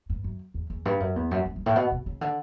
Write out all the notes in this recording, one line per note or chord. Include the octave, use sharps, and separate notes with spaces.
G2
F#2
E2
E2
G2
F#2
E2
F#2
F#2
G2
A2
B2
B2
C#3
D3